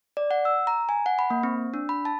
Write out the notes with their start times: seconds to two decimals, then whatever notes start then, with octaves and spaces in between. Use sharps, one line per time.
0.17 D5
0.31 F#5
0.45 E6
0.67 A#5
0.89 G#5
1.06 F#5
1.19 B5
1.30 A#3
1.43 C4
1.74 D4
1.89 B5
2.05 A5